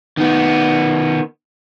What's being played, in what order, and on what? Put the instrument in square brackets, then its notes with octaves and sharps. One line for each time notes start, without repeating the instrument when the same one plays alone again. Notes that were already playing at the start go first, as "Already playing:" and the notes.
[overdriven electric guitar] D#3 B3